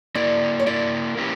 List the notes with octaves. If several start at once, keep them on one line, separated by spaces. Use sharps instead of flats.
A#3 E4 A#4 D5
C#5
A#3 E4 A#4 D5
A#3 C#4 E4 G4 B4